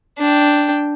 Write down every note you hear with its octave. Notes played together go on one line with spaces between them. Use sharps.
D4 G5